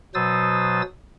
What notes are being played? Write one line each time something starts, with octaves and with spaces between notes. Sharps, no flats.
B2 F#3 C5 D#6 E6 A6